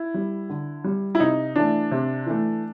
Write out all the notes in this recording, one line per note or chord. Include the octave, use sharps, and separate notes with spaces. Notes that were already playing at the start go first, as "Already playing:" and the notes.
Already playing: E4
G3
D3
G3
E4
C3 D#4
E3 A3 D4
C3
E3 A3